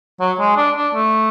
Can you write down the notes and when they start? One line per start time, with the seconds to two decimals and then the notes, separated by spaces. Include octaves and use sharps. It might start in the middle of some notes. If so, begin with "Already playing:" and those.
0.20 F#3
0.39 G#3
0.57 D4
0.76 D4
0.94 A3